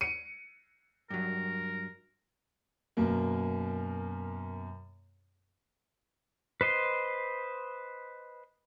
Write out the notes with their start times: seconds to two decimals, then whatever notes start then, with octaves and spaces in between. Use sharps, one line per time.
0.01 C#7 D#7
1.10 G2 F#3 A#4
2.97 F#2 B2 A#3
6.61 B4 C5 D#5 C6